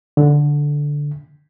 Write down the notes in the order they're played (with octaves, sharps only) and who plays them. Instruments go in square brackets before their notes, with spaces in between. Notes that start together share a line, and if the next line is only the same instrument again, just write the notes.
[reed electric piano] D3